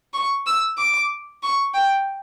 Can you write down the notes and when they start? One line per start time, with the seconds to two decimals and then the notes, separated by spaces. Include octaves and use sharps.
0.14 C#6
0.46 E6
0.78 D6
1.43 C#6
1.74 G5